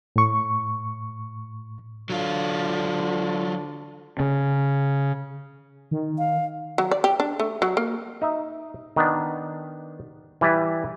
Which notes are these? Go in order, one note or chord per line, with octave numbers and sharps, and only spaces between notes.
A2 C#6
D3 F#3 F4
C#3
D#3
F5
F#3
D5
G4
D4
A3
F#3
A#3
D#4 E5
D#3 B3 D4
E3 G3 B4 D5 E5